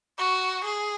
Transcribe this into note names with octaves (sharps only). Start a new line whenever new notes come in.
F#4
G#4